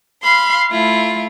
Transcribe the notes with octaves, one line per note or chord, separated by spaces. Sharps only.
F5 B5 C6
A3 E4 F4